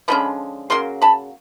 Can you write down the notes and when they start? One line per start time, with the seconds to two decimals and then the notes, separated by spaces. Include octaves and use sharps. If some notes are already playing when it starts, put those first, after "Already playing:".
0.08 D3 F3 G#3 C#4 B5
0.70 C#3 F#3 A#3 C6
1.02 A5 B5